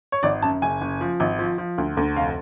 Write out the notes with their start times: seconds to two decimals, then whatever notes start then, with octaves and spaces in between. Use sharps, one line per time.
0.12 C#5
0.23 G#1 D5
0.42 F#2 A5
0.62 F#1 G#5
0.81 F#1
1.01 F3
1.20 G#1
1.39 F3
1.58 F3
1.78 D2
1.97 D2
2.16 F1 F5